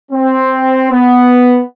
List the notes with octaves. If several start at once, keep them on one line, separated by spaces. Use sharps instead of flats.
C4
B3